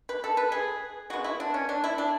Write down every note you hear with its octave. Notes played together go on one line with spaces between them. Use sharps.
B4
A4
B4
G#4
C#3 G#3 B3 F#4
E4
D4
C#4
D4
E4
D4